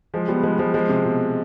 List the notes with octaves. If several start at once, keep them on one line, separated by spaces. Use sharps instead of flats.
F3 G#3
G3 B3
F3 G#3
F3 G#3
F3 G#3
C3
B2